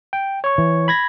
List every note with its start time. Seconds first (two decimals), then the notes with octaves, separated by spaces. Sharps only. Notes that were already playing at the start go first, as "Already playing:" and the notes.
0.13 G5
0.44 C#5 C#6
0.58 E3
0.88 B5 G#6 A#6